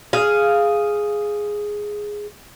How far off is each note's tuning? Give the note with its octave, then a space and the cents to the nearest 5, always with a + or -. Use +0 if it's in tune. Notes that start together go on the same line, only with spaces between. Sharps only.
G#4 +0 F5 -5